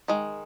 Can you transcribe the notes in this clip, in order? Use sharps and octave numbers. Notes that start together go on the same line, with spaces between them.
D#3 G#3